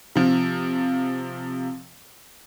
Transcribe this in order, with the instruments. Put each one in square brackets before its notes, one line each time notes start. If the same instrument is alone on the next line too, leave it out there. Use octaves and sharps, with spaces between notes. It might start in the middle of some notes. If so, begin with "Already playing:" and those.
[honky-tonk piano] C3 F3